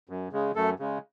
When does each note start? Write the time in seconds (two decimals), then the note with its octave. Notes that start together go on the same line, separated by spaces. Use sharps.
0.09 F#2
0.32 C#3 G#3
0.55 F#2 A3 A4
0.79 C#3 G#3